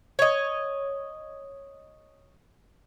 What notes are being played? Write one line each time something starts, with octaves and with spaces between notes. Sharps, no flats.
C#5 D#5